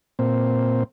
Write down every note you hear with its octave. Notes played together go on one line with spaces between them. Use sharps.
A#2 C4